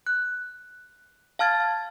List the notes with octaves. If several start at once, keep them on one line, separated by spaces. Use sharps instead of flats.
F#6
F5 A5 F6 G#6 A6